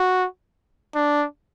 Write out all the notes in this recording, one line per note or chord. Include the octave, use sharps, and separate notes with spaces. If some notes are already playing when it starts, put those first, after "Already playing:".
Already playing: F#4
D4